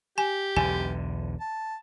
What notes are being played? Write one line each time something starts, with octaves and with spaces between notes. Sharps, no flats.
G4 G#5
B1 E2 D3 G#5
A5